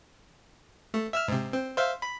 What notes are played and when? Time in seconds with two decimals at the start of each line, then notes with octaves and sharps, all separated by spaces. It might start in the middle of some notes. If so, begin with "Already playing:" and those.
0.94 A3
1.13 E5 E6 F6
1.28 G#2 C3
1.53 C4
1.77 C5 E5 F5
2.02 B5